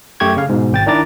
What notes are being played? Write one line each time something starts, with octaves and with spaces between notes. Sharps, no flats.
F#2 A3 G4 G5 C#6 G#6
C#3 F5
G#2 B2
G#1 G5 A6
D#3 D4 E4 A#5 D6 A6